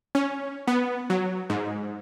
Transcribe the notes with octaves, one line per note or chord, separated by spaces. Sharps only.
C#4
B3
F#3
G#2